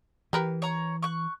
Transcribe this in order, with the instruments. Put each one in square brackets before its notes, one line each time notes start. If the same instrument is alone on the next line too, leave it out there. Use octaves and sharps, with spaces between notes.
[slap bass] E3 [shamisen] G4 A#4 B4
[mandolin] C#5 A#5
C#6 F#6